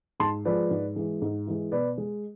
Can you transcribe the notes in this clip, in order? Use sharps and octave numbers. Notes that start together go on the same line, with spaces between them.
G#2 A5 C6
F3 G#3 B4 D5
G#2
E3 G#3
G#2
E3 G#3
B2 B4 D5
G#3